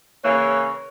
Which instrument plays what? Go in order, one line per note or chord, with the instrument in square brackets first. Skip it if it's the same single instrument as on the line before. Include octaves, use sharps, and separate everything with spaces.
[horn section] C#3 E3 A#3 [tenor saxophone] C#5